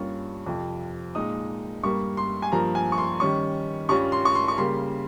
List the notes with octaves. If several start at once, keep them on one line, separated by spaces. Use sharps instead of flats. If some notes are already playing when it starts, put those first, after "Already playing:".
Already playing: G2 G3 A#3 C#4 F4 C#6
F2 C3 F3
A#2 G#3 D#4 D#6
G2 G3 A#3 C#6
C6
G#5
G2 F3 A#3 A#5
G#5
C#6
C6
D#3 G3 C#4 C#6
G2 G3 C#4 F4 C#6
C6
C#6
C6
C#6
C#3 G3 A#3 C6